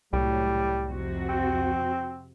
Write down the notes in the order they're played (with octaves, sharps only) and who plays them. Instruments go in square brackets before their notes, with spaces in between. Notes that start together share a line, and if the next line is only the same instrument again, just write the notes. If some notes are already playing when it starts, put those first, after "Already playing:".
[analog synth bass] C2 [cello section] A2 F#3 [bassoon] G3
[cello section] F2 C3 F#4
[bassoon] C4